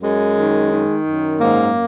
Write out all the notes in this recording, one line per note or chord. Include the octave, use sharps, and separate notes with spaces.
F#2 G#3
D#3
D#3
F#2
G#2 A#3